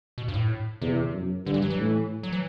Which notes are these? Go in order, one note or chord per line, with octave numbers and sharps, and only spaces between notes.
B2
G2
A2
E2 C3
F#2
G2 D3
E3
F#3
E3
A2
F#3
E3